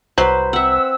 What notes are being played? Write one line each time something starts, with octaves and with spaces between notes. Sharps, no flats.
C2 F#3 B4 C5
C4 E5 F#5 E6